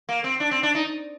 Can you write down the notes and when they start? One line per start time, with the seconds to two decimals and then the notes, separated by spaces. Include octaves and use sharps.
0.09 A#3
0.24 C4
0.40 D4
0.51 C4
0.63 D4
0.75 D#4